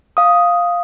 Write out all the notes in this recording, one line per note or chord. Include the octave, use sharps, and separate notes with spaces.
F5 D#6